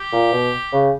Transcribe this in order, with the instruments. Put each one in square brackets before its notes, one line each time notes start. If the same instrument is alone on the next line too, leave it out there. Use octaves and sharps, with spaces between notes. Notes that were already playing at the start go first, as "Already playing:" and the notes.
Already playing: [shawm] G4
[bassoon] A#2
B2
C#3